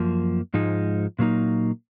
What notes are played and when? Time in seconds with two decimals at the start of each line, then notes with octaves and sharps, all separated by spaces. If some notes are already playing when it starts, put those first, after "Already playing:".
Already playing: F#2 F3 A#3
0.54 G#2 F3 G#3 D#4
1.19 A#2 F#3 A#3 D#4